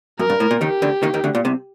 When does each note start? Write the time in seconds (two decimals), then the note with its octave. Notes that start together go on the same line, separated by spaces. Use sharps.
0.19 F#2 A#4
0.30 G2
0.40 A2
0.51 A#2
0.61 D#2 D#3 G4
0.82 D2 D3
1.03 D#2 D#3
1.14 D#2 D#3
1.24 D2 D3
1.35 A#2
1.45 C2 C3